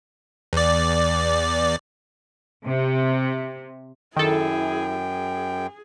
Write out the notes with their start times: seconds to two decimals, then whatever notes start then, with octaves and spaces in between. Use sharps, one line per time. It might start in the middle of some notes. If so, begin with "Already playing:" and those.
0.53 E2 D5
2.65 C3
4.17 F#2 D#3 E4 G#4 A4 G5
4.95 G#4